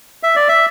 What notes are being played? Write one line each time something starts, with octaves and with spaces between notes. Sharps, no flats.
E5
D5
E5